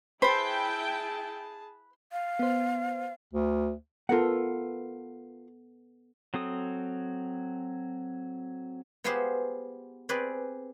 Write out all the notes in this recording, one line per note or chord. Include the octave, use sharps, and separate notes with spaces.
E4 G#4 B4 C5 G5 A5 B5
F5
B3 C5
D2
B3 F4 A4 A#4 F#5
F#3 C4 A4 D#6
B3 F4 G4 G#4 C5 F#5
C4 G#4 B4 D5